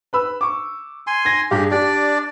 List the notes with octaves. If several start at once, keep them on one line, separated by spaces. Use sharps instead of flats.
B4 B5 E6
C#6 D6
G#5 C6
G#6 A#6
G2 G4 G#4
D4 G4 D5